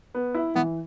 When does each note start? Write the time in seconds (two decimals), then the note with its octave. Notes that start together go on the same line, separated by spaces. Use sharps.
0.15 B3
0.34 E4
0.55 E3 B3